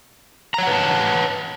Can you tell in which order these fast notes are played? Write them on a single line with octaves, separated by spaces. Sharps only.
A#5 C#5 F#5 B4 A5